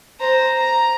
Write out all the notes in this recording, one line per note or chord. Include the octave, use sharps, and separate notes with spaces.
C5 A#5
A#5